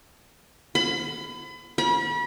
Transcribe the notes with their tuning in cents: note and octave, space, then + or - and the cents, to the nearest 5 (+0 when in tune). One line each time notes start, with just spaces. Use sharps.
B5 +30
B5 -35